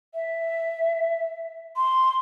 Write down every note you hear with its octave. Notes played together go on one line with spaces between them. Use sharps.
E5
C6